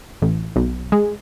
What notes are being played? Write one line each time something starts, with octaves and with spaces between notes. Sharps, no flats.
A1
B1
G#3